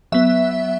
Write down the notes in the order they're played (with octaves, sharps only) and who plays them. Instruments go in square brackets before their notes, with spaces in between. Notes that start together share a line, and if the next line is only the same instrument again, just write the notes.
[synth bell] F#3 B3 E5